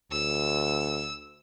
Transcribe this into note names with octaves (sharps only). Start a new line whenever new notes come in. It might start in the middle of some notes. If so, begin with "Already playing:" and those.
D2 E6